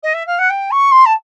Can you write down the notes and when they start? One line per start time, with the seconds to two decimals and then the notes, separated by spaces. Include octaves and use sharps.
0.03 D#5
0.14 E5
0.27 F5
0.38 F#5
0.50 G5
0.71 C#6
0.91 C6
1.06 A5